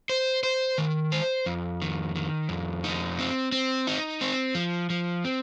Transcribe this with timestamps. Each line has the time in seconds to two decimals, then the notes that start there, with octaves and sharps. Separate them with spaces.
0.10 C5
0.43 C5
0.78 D#3
1.12 C5
1.46 F2
1.82 D#3
2.16 D#3
2.49 F2
2.84 D#4
3.19 C4
3.52 C4
3.87 D#4
4.21 C4
4.55 F3
4.90 F3
5.24 C4